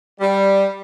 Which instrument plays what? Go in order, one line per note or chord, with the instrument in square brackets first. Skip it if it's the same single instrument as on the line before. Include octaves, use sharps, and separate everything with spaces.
[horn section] G3